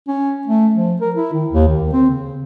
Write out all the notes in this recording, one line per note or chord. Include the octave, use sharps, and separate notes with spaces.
C#4
A3
F3
A#4
E4
D#3
D#2
D#3
C4
C#3